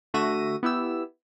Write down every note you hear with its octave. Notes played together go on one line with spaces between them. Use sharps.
D3 A3 F#4 E5 A#6 D#7
B3 E4 G4 E6